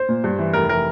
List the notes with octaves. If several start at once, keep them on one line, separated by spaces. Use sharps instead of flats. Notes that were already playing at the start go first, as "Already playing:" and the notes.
Already playing: C5
A#2
G2
E3
F1 A#4
E3 A#4